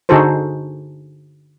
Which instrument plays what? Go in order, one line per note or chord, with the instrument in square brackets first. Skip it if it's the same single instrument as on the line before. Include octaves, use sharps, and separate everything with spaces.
[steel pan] D3 D#4 F#4 G#4 A4 C5